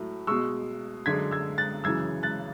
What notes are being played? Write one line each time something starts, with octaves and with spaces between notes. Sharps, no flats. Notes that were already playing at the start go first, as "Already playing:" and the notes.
Already playing: A2 F#3 A3
B2 G#3 C#6 E6
F#2 D3 G#3 G#6 B6
E6 G#6
F#6 A6
F#2 C#3 E3 E6 G#6
F#6 A6